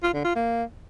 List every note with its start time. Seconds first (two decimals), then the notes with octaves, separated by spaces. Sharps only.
0.03 F4
0.14 D3
0.25 F4
0.36 A#3